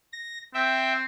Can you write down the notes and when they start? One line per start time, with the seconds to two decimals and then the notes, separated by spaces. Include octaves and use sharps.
0.13 A#6
0.54 C4 E5 G5